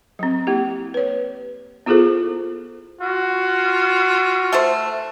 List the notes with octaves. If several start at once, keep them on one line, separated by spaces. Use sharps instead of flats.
F#3 C4
A#3 E4 G4
B4 C#5
B3 E4 F4 G#4 A4 C5
F4 F#4
A3 A4 C5